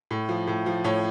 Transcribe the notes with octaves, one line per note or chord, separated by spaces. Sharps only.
A2
F3
A2
F3
A2 C#5